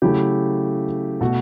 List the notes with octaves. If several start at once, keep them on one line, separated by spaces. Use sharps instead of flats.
C#3 F#3 A3 E4 G4
B2 A3 F#4 A4